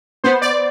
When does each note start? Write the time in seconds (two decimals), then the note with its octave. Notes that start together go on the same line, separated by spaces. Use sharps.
0.24 B3 C5
0.42 D5